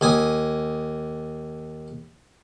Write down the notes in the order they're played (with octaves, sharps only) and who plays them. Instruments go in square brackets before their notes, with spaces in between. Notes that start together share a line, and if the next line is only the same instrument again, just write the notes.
[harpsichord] D#2 G#5 D#6